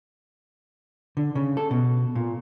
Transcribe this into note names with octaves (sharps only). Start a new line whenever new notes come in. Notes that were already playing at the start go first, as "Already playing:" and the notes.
D3
C#3
A4
B2
A#2